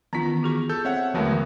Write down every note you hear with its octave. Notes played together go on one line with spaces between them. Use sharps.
D#3 E3 B3 C#4 F4 A#5 B6
F#4 G#4 C#6
A4 G6
C4 C#5 E5 F#5
D#2 D3 E3 F#3 G#3 A3 B3 A5